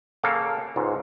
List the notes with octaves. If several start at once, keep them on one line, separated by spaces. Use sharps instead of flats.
C#3 A#3 A4 F5
C#2 G#2